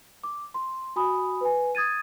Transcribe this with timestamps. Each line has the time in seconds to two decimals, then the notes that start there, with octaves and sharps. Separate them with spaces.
0.24 D6
0.54 C6
0.96 F#4 G#5 B5 D#6
1.41 B4 G#5
1.75 D#6 G#6 A6 D#7